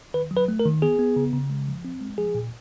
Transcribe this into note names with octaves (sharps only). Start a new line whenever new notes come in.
D#3 B4
F#3
B4
A3
A#4
D#3
B3 G#4
B3
C#3
C#3
G#3
F3
C4
G#3
F3 G#4
A#2